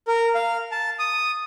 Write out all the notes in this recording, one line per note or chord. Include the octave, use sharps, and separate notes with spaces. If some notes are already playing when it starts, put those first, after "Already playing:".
A#4
F5
A5
D#6